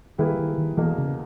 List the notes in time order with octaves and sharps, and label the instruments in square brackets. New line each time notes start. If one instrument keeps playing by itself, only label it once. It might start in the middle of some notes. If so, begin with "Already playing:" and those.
[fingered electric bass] D#3 [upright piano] G3 A#3 E4 G#4 B4
[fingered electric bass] D#3
D#3
[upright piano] E2 B2 A#3 [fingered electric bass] E3
[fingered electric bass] C#3